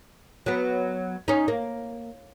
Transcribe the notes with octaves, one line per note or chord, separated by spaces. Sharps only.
F#3 B3
C#4 D#4
A#3